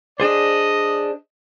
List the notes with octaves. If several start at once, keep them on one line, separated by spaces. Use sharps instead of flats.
D4 G#4 C5 D#5